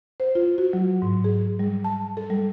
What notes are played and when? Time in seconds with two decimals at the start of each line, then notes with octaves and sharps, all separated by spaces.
0.20 C5
0.35 F4
0.58 F#4
0.73 F#3
1.02 G#2
1.24 G#4
1.59 G3
1.84 A5
2.17 A4
2.30 G3